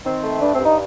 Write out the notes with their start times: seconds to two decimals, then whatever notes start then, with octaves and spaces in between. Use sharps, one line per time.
0.05 D#3 C4
0.23 A3
0.42 G2 D4
0.53 C4
0.59 G2
0.66 D#4